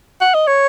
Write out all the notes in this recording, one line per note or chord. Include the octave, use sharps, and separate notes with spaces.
F#5
D#5
C#5